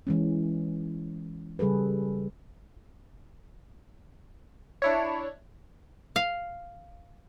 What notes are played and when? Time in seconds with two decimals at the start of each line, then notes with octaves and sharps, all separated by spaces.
0.07 E3 G#3 C#4
1.59 C#3 G3 G#4 A4 B4
4.82 D4 E4 C#5
6.16 F5